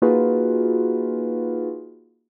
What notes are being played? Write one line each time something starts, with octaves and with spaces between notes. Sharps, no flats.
A#3 D#4 F4 F#4 G#4 B4